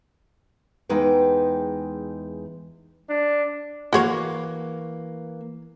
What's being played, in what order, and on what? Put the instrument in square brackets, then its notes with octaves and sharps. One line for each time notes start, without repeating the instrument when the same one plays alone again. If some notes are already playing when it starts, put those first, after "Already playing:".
[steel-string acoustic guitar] E2 G#3 D#4 B4 G5
[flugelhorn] D4
[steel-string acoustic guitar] E3 A#3 [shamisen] F#4 G#4 C#5